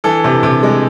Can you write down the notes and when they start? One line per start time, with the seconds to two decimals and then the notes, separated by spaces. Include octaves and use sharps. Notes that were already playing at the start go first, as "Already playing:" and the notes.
0.04 E3 A4
0.24 C3
0.43 C3
0.63 G#3